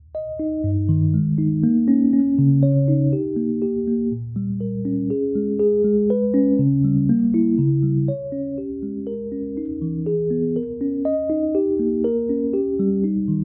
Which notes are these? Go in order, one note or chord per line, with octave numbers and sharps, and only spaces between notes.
D#5
D#4
G2
D#3
G#3
D#4
A#3
C#4
C#4
C#3
C#5
D#4
G4
A#3
G4
A#3
A#2
G3
A#4
C#4
G#4
G#3
G#4
G#3
B4
C#4
C#3
G3
A#3
E4
C#3
G3
C#5
C#4
G4
G#3
A#4
C#4
D#4
E3
G#4
B3
A#4
C#4
D#5
D#4
G4
A#3
A#4
C#4
G4
G3
D#4
D#3